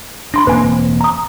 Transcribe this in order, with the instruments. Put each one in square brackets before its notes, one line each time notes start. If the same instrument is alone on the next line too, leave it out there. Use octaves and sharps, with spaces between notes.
[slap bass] D4 [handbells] B5 C6 A#6
[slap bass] E1 A#3 C4 [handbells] B4 G#5
[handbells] A#5 D#6